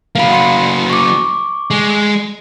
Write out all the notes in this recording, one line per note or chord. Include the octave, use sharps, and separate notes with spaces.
F#3 A#3 F5 B5
F#5 C6 C#7
C#6 D6
G#3